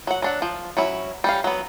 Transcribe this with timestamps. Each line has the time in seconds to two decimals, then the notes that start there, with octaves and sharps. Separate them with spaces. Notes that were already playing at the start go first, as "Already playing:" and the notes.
0.07 F#3 F#5
0.22 F#3 D4 F#5
0.42 F3
0.77 F#3 C#4 E4
1.24 G3 C#4 F5
1.44 F#3 B3